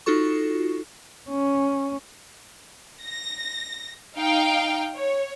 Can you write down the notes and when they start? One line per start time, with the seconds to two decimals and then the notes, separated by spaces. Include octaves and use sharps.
0.06 D#4 F4 F#4 A4 C#6
1.29 C#4
3.02 A#6
4.17 D#4 F5 G5
4.94 C#5